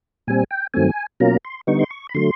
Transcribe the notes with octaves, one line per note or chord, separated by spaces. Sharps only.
A#2 G3 C4 G#5
G5
G2 D#3 F#3 A3 C4 G#5
B2 F#3 A#3 C#4 F4 A#5
C6
D3 G3 B3 D#4 C#6
C6
C#6
B5
D3 F#3 A3 C6